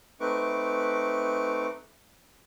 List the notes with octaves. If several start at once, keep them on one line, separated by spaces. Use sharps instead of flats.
A3 C4 D#4 B4 C#6 D6